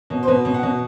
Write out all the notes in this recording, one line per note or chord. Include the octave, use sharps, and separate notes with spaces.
B2
C5
B2 B4
B2
F#5
B2